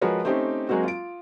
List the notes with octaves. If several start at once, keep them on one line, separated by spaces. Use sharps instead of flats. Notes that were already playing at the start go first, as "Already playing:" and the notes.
F3 G#3 F#4 A#4 B4 C#5
A3 C4 C#4 D#4 G4 C5
F#3 G#3 A#3 C4 F#4
F4 D7